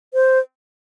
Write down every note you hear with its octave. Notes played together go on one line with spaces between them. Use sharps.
C5